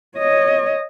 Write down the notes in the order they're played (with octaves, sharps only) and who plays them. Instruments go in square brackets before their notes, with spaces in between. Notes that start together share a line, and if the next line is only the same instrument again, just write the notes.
[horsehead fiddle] C#5 D#5